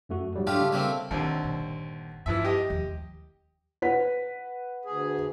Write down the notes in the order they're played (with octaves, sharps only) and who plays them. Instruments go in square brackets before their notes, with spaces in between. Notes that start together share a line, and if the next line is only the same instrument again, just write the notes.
[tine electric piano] F#2 A3 F#4
G#2 F#3 G3
[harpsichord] A3 F4 G4 [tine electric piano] D4 D6
[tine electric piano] C#3 G3
[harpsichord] A3 A#3 C4
[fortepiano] D#2 D3 C4 [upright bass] D#3
[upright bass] G1 A#2
[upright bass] G2 [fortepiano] E3 F3 E5
[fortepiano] G4 D#5
[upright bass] D#2 F3
[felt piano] B4 F#5 B6
[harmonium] D2 G#4